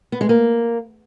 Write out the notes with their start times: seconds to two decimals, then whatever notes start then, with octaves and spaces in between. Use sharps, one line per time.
0.12 B3
0.21 G#3
0.29 A#3